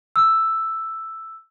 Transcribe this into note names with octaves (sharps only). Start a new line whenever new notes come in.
E6